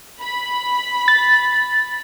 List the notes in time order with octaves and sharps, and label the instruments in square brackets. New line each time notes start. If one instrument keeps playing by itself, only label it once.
[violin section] B5
[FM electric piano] A6